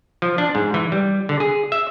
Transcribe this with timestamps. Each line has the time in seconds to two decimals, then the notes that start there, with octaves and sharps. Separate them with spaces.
0.22 F3
0.38 D4
0.55 G#2
0.74 E3
0.92 G3
1.29 D3
1.40 G#4
1.72 E5